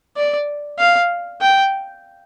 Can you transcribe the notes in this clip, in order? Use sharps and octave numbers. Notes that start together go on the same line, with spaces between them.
D5
F5
G5